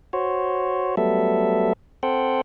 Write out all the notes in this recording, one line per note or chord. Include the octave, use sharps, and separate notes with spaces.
F#4 C5 C#5
F#3 G3 A3 B3 A4 E5
C4 A4 C5 F#5 G5